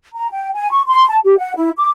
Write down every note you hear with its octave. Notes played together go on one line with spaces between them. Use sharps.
A#5
G5
G#5
C#6
C6
A5
G4
F#5
E4
D6